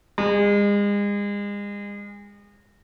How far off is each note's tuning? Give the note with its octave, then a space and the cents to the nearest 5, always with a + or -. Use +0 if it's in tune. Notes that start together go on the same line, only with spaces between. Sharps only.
G#3 -35